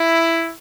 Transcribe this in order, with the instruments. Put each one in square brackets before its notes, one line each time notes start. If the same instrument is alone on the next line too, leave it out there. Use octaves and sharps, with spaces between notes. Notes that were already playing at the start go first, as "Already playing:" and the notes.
Already playing: [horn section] E4